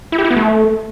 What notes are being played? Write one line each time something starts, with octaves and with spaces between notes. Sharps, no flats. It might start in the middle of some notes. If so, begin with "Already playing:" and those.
E4
G4
E4
B3
A3